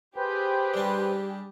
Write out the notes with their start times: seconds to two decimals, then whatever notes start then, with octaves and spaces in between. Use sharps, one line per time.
0.16 G4 G#4 B4 C5 G5
0.74 G3 D4